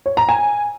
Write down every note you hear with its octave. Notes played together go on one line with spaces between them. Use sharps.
C#5
A#5
G#5